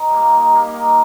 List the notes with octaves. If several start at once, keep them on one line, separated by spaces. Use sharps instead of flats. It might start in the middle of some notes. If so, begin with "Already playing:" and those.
Already playing: D#3
G3 A#3
D#3
G3 A#3
D#3